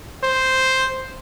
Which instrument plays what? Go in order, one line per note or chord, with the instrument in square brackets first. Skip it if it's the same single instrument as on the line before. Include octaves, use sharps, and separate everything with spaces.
[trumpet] C5